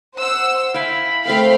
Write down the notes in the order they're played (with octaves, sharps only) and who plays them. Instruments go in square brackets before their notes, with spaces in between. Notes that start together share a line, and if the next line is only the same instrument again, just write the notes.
[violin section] C5 F#5 E6
[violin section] E4 [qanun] F5 G5 G#5 [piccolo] B5
[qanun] A3 C4 A#4 [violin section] F5 G5